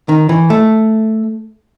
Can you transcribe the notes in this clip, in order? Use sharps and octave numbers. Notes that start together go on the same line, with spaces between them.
D#3
E3
A3